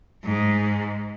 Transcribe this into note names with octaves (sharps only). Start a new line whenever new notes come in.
G#2